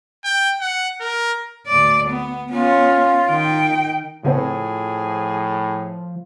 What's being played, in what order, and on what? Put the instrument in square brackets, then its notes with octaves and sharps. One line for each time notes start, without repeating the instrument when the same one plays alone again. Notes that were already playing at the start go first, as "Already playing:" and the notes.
[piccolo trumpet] G5
F#5
A#4
[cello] D2 D5
B3
[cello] B3 C#4 [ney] F4
[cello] D#3 G5
[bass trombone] A2 [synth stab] C#3 B3 C4 [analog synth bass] F3 [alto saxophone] G#4